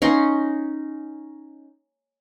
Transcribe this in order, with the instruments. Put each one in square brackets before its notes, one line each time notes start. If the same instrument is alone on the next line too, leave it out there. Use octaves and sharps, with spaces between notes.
[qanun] C#4 D#4 C6